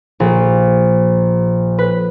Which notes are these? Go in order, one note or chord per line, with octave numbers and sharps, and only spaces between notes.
A#1
B4